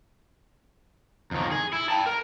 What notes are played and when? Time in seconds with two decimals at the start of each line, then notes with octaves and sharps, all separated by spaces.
1.31 F2 D#3
1.51 G#4
1.73 E4
1.90 G5 A5
2.06 A#4